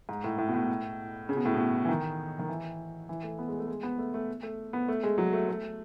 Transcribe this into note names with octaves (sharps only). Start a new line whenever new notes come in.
G#2
A2
A2
B2
A2
C#3
B2
A2
B2
E3
D#3
D#3
E3
E3
A3
B3
G#3
A3
G#3
B3
A3
A3
A3
B3
A3
G#3
F#3
A3
A3